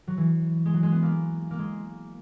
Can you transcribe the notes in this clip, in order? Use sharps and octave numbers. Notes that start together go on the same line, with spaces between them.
F#3
E3
G#3
F#3
G#3
B3
A#3
A#3
G#3